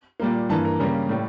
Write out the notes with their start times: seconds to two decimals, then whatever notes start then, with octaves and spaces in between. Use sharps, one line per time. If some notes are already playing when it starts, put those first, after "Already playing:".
0.20 A#2 G3 A#3
0.49 G2 E3 A#3 A5
0.65 A#4
0.80 C#3 G3 A#3 A#4
1.09 A2 G3